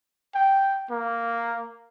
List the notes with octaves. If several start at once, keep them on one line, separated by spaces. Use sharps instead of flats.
G5
A#3